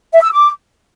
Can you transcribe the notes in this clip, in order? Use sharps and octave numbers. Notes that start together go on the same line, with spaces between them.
E5
E6
D6